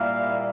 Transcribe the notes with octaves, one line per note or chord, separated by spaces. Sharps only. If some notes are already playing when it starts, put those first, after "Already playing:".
Already playing: A#2 G3 A#3 E4 F5